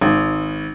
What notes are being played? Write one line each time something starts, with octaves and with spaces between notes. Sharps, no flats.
G#1